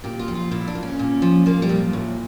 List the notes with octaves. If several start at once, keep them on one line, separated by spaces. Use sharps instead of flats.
A#2 G4
F4
F3
F4
A#2 E4
D4
A#2
C#4
A#2
F3
F3 A#3
G3
A#2
A2